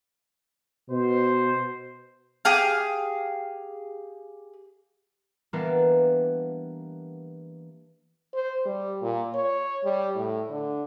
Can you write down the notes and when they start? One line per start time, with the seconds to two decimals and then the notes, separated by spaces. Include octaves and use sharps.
0.90 B2 C5
2.45 G4 G#4 F5
5.53 E3 G3 A#3 B3 D4 A#4
8.34 C5
8.66 G3
9.02 A#2
9.34 C#5
9.84 G3
10.15 A2
10.50 D3